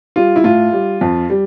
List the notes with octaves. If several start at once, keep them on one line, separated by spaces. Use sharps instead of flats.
G3 F4
E4
A2 F4
G3
F2
G3